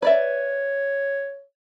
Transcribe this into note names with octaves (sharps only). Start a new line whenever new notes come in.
B4 C#5 D5 E5